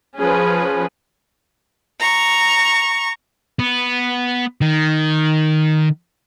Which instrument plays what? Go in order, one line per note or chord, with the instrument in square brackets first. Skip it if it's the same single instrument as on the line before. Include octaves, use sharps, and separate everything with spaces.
[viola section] F3 C#4 G#4 B4
[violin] A#5 C#6
[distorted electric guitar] B3
D#3